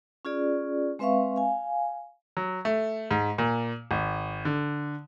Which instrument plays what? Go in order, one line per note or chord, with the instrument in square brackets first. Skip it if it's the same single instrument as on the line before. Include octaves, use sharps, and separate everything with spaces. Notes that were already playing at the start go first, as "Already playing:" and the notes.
[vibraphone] C#4 F4 G#4 D5
G#3 C4 B4 E5 F5 C#6
F5 G#5
[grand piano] F#3
A3
G#2
A#2
G#1
D3